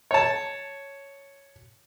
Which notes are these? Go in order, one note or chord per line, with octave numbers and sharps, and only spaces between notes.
C#5 A5